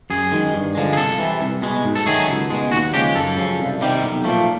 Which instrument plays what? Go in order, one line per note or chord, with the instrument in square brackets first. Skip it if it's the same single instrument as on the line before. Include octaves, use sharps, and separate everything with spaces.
[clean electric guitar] F#2 G#4
D#3 G#3
G2
D3 F3 G#3
G#4
C2 A4
C3 E3
C2
B2 G#3
G#2
A4
D#3 F#3 A3 G#4
C#2
B2 G#3
D#2 F#4
C#3 F3 G#3 G4
F#2 A4
C#3 F3
C2
C3 D#3 G3
B1
A#2 F3 A3